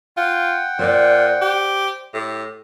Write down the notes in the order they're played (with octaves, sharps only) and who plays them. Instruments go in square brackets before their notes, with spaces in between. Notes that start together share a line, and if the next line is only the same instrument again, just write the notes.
[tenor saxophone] F4 [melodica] F#5 G5
[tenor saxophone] A#2 [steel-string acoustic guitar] C5 D5
[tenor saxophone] G4
[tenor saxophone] A2 [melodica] G4